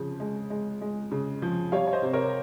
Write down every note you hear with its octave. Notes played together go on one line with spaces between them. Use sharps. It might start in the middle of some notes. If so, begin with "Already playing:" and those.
Already playing: C#3 F3
G#3
G#3
G#3
C#3
F3
G3 C#5 F5
C#5
C5 D#5
C3
A#4 C#5